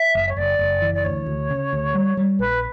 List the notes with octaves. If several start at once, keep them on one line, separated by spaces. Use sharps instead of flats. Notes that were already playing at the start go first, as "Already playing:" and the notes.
Already playing: E5
F#1
C#5
F#1 D5
F#1
E3
D5
D2 C#5
D2
C#3
D2
G3
G3
A#1 B4